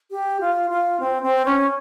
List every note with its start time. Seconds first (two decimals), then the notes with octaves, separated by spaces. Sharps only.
0.11 G4
0.41 F4
0.70 F4
1.00 C4
1.22 C4
1.45 C#4